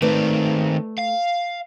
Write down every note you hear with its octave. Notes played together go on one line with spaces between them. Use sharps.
D#3 A3 C4 B4 D5
F5